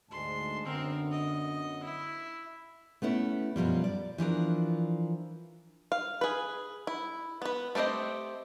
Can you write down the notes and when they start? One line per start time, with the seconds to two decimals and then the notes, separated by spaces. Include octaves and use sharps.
0.11 D2 G#2 G#3 A5 C6
0.65 F#2 D3 B3 C4 A#4
1.11 D#5
1.84 E4
3.02 A3 B3 C#4 E4
3.56 F#2 B2 F3 G3
3.84 D5
4.18 E3 F3 D4 A#4
5.92 F5
6.21 G#4 B4
6.87 E4
7.42 B3 B4
7.75 A3 C4 G4 C5 D#5